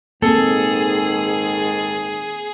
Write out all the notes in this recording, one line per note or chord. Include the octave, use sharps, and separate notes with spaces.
G#2 D#3 A#3 C4 G#4 A4